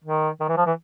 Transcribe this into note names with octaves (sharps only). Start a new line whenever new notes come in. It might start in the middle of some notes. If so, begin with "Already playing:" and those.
D#3
D#3
E3
F3
E3